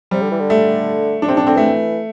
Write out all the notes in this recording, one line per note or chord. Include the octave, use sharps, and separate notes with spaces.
C3 G3
D3
E3
D3
A3
D4
C3 C4
D4
D3 C4
E3 A3